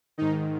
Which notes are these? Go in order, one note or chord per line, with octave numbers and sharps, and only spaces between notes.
G#2 D#3 D#4